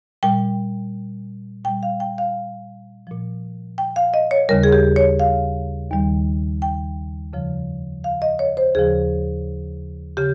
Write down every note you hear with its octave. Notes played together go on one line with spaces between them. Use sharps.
A#2 G3 G5
A#2 G3 G5
F5
G5
F5
A#2 F3
G5
F5
D#5
C#5
D#2 C#3 G3 A#4
G#4
G4
C#5
F5
D#2 D#3 G3
G5
F2 C#3 F3
F5
D#5
C#5
C5
D#2 C#3 F3 G#4
C#3 G4